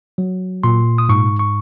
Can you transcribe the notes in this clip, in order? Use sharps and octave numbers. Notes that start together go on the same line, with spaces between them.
F#3
A#2 C6
D#6
G#2 C#6
C#6